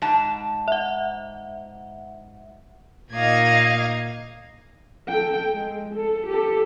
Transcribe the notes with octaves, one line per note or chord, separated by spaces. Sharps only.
G#2 A5
E5 F#5
A#2 A#3 D#4 D#5 F5 G#6
A4 G5
G#3
A4
G4 A4